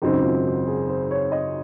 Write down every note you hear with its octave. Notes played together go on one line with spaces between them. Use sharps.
G#1 F#2 C#3 F#3 C4 D#4
F4
F#4
G#4
C5
C#5
D#5